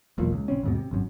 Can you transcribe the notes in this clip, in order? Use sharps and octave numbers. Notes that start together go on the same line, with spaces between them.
E1 B1 A#2
C#2
A#1 C4 C#4
D#2 G#2 B2
C3
G#1 F#2